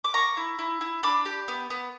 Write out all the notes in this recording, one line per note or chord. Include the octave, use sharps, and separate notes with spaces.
D6
A#3 A#5 C#6
E4
E4
E4
D4 B5 D6
G4
B3
B3